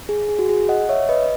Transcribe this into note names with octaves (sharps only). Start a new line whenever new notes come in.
G#4
G#4
F#4
G#4
D#5 F#5
C#5 E5
B4 D#5